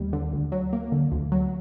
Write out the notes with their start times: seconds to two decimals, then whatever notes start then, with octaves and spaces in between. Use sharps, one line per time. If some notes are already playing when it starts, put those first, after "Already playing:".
Already playing: D#2 G3
0.13 D3
0.33 D2
0.52 F#3
0.73 A#3
0.92 D3
1.11 D2
1.32 F#3